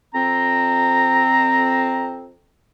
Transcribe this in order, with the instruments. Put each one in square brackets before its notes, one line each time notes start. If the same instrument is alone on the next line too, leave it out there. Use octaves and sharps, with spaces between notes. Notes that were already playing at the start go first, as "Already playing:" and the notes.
[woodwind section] F2 C4 [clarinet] A#5